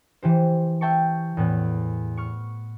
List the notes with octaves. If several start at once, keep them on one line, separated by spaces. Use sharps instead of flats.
E3 G4 C5
E5 G5 A5 C#6
E2 A2 B3
C#6 F6